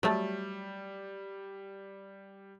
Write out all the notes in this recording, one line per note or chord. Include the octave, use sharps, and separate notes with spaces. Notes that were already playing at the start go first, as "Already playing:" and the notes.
F#3 G3 A3